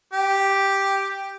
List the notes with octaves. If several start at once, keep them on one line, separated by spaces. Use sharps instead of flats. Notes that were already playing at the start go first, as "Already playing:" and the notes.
G4